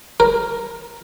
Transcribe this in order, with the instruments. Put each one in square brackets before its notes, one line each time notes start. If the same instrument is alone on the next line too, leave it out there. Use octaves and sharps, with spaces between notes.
[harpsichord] A#4